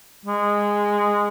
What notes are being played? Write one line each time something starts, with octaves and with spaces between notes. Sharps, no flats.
G#3